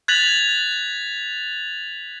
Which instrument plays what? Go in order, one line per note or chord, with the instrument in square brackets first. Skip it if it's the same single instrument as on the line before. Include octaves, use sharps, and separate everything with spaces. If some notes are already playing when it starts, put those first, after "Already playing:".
[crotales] F#6 G#6 A6 B6 F7 F#7